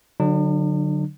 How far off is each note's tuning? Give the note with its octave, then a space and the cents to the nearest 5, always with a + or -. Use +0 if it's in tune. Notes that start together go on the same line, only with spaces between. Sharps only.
D3 +0 F#3 +0 D4 +45